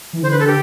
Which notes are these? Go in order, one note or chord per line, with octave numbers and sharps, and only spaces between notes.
E3
D3 C5
B4
A4
G4